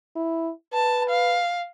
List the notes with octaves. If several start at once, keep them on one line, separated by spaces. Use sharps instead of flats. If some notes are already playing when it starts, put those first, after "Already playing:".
E4
B4 A5
F5